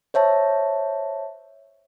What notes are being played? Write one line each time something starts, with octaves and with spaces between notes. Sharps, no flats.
C5 C#5 E5 A5